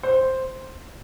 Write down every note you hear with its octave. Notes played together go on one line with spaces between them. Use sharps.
C5